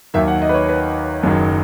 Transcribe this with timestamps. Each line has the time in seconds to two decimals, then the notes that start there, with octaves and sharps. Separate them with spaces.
0.14 D#2 D#3 F#3 E5
0.28 F#5
0.42 D#5
0.49 B4
0.54 C#5
0.69 B4
1.23 F#1 F#2 D#3 F#3